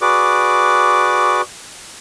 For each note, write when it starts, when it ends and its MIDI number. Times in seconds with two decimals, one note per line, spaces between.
0.01 1.41 66
0.01 1.41 68
0.01 1.41 71
0.01 1.41 74
0.01 1.41 86